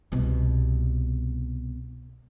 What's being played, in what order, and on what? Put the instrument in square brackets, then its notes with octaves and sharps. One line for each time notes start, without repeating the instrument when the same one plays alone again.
[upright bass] C2 B2